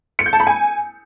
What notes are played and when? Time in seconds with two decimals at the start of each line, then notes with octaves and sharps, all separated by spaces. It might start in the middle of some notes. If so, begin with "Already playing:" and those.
0.19 C#7
0.26 G6
0.33 A5
0.40 B5
0.47 G#5